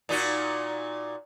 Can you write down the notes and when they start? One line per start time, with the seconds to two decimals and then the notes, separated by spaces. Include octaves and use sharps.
0.09 A#2 D#4 F#4